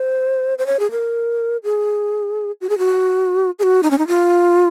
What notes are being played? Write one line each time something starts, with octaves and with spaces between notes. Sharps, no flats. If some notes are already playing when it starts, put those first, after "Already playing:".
Already playing: C5
C5
C#5
G#4
A#4
G#4
F#4
G#4
F#4
G#4
F#4
D#4
C#4
D#4
F4